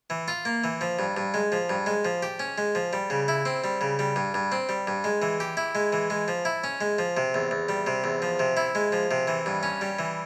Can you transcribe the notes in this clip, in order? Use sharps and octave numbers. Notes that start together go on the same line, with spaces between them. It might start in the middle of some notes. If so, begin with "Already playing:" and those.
E3
F4
A#3
E3
F3
G2
G2
G#3
F3
G2
G#3
F3
G4
C#4
G#3
F3
G3
C#3
E4
C4
G3
C#3
G3
G2
G2
C4
G3
G2
G#3
E3
G4
E4
G#3
E3
G#3
F3
E4
C#4
G#3
F3
C3
E2
E2
G3
C3
E2
F3
C3
E4
G#3
F3
C3
E3
G2
C#4
G3
E3